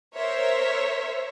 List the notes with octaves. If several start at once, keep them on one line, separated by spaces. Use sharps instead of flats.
A#4 C5 C#5 E5